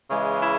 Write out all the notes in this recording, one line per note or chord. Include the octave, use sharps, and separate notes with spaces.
C#3 E3 G#3
E4